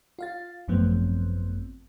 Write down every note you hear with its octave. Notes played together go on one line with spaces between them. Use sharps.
F4 F5 A6
G#1 F#2 F3 A3 B3 C4